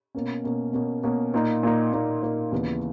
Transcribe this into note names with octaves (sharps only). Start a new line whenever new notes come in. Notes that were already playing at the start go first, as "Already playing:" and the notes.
B2 A#3 C#4
B2 A#3 C#4
B2 A#3 C#4
B2 A#3 C#4
A#2 A#3 D#4
A#2 A#3 D#4
A#2 A#3 D#4
A#2 A#3 D#4
D#2 C#3 E3 B3